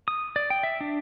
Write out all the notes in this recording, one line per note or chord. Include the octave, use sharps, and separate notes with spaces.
D#6
D5
G5
E5
D4